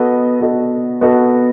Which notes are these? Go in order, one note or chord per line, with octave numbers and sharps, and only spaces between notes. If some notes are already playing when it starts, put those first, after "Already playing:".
Already playing: B3 F#4 A4 D#5
B3 F#4 A4 D#5
B3 F#4 A4 D#5